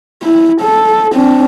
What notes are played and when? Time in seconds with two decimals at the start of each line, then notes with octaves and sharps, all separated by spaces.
0.23 E4
0.61 A4
1.13 C4 D4